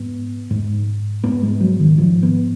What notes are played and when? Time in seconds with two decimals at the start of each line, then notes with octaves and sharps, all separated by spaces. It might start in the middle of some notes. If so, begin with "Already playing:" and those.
Already playing: G#2 B3
0.50 G#2
1.24 G#2 B3
1.43 G#3
1.61 F#3
1.80 D#3
1.98 G#2 F3
2.23 B3